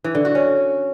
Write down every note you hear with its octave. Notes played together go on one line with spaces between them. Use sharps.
E3
D3
F#4
C#4